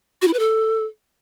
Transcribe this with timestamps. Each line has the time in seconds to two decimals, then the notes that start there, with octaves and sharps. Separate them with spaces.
0.22 F#4
0.28 E4
0.33 B4
0.39 A4